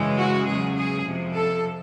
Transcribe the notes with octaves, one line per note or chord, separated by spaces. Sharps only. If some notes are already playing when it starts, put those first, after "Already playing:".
Already playing: F#2 C#3 E3 G#3
F#4
E2 C#3 F#3 G#4
G#4
F2 C3 F3
A4